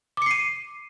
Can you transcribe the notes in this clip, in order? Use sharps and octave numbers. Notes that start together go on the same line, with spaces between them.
D6 C7 C#7 D#7